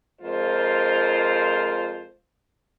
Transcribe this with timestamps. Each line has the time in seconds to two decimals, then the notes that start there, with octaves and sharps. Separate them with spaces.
0.21 F2 G#3 F4 A#4 C5